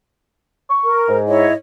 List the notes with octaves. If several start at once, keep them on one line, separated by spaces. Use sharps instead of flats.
C#6
A#4
G#2
E4 C#5 D#5